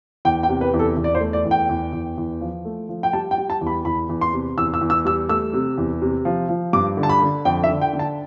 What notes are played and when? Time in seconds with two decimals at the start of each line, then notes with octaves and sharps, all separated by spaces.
0.25 E2 G5
0.43 G5
0.49 C3
0.61 B4
0.74 E2
0.79 A4
0.97 E2
1.04 D5
1.15 C5
1.20 A3
1.33 D5
1.45 E2
1.51 G5
1.69 E2
1.93 E2
2.18 E2
2.41 F3
2.65 A3
2.89 F3
3.03 G5
3.13 G3 A5
3.31 G5
3.37 G3
3.50 A5
3.61 E2
3.67 B5
3.85 E2 B5
4.09 E2
4.21 C6
4.33 C3
4.57 E2 E6
4.74 E6
4.81 E2
4.90 E6
5.05 G3 E6
5.29 A3 E6
5.53 C3
5.78 E2
6.02 C3
6.25 F3
6.49 F3
6.73 G2 D6
6.97 D3
7.03 A5
7.09 B5
7.22 D3
7.45 F2 G5
7.64 E5
7.70 D3
7.81 G5
7.93 D3
7.99 A5